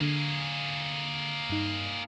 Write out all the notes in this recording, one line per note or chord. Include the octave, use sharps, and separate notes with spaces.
D3 A#3 G#4
G2 D#4